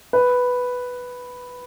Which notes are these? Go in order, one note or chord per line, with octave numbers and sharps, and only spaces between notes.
B4